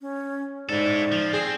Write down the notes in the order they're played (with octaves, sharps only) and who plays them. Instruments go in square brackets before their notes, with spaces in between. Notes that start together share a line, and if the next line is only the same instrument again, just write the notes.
[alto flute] C#4
[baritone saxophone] G#2 [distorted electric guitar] E4 A4 [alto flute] D5
[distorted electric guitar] F3
[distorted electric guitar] C4 [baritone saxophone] G#4